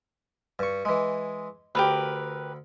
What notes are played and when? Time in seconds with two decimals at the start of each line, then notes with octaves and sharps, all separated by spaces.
0.59 G2 C#6
0.85 E3 G#3
1.75 D2 G4 A#4 B4